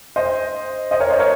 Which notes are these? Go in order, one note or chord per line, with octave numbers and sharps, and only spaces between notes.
C5 D#5
C5 D#5
A#4 C#5
C5 D#5
A#4 C#5